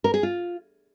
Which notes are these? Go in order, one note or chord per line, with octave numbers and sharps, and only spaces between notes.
A#4
G#4
F4